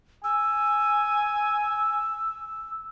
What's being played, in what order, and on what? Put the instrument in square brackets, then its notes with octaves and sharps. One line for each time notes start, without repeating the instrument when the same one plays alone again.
[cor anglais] G#5 [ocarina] E6